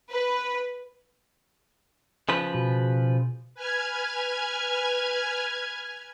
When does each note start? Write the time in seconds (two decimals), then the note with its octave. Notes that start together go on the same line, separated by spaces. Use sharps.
0.11 B4
2.29 C#3 F3 B4
2.54 B2
3.55 B4 G#5 F6 G#6